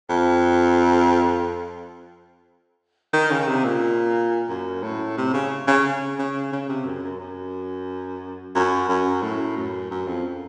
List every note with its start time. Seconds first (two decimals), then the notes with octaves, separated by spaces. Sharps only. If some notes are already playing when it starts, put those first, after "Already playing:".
0.09 F2
3.13 D#3
3.31 C#3
3.47 C3
3.64 A#2
4.49 F#2
4.83 A2
5.17 C3
5.33 C#3
5.67 C#3
6.18 C#3
6.52 C#3
6.69 C3
6.86 F#2
7.03 F#2
7.19 F#2
8.55 F#2
8.89 F#2
9.22 A2
9.56 F#2
9.90 F#2
10.07 F2